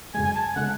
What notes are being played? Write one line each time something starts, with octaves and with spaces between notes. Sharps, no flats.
F#2 C#3 G#3 G#5
G#5
A5
G#5
C#3 G#3 F#5